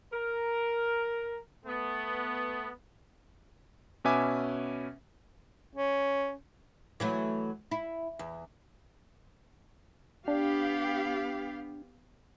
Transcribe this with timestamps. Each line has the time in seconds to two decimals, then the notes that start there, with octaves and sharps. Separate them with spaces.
0.12 A#4
1.65 A3 B3
4.05 B2 C#4 B4 E5 G#5 D6
5.76 C#4
7.00 E3 F#3 A3
7.71 E4
8.19 E2
10.28 B3 D4 G4 F5